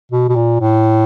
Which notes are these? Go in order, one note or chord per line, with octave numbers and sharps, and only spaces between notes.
B2
B2
A#2
A2